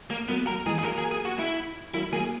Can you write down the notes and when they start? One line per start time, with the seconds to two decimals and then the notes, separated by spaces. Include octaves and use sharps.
0.10 A#3
0.28 F#3 A#3 B3
0.47 F#3 A#3 A#4
0.66 E3 G#3 G#4
0.79 G#4
0.83 F#3 A#3 A#4
0.98 G#4
1.11 G#4
1.25 F#4
1.39 E4
1.94 F#3 A#3 E4
2.12 F#3 A#3 G#4